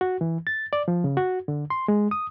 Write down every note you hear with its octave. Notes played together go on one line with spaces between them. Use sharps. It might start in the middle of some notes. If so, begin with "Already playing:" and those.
F#4
E3
A6
D5
F3
C#3
F#4
D3
C6
G#3
D#6